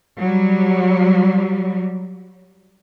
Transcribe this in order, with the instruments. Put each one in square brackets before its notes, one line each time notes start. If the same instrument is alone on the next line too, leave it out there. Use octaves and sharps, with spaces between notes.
[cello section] F#3 G3